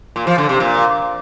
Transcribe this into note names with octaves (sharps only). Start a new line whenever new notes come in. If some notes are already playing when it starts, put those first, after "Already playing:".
A#2
F3
D3
C3
A#2